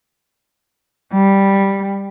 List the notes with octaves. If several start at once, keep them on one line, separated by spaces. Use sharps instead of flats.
G3